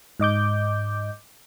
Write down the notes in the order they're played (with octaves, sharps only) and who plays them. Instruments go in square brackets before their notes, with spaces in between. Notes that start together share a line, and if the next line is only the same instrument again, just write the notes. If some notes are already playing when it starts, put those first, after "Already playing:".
[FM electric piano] G#2 D#5 D6 G6